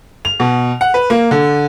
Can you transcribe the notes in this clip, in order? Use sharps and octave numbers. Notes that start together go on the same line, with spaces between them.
F7
B2
F#5
B4
A#3
D3